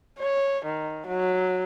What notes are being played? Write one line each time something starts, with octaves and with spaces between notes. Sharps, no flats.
C#5
D#3
F#3